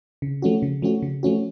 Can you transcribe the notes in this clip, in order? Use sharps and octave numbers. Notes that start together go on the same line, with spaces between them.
C#3
F3 A3 C#4 F#4
C#3
F3 A3 C#4 F#4
C#3
F3 A3 C#4 F#4